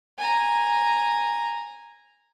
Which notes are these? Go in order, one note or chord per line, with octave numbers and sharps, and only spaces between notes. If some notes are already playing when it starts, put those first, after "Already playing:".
G#5 A#5